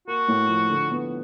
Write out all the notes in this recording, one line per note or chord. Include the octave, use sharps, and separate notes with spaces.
A#3 F#4
A2
F3
D3
B3